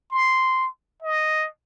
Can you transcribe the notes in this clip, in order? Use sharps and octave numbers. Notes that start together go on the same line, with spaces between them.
C6
D#5